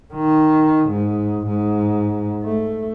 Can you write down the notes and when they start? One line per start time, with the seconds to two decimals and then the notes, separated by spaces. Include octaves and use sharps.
0.14 D#3
0.90 G#2
1.47 G#2
2.44 A3